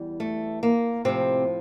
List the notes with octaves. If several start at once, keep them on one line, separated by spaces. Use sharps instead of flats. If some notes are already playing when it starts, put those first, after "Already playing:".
Already playing: E2 E3 G3
A3
A#3
A2 C3 F3 C4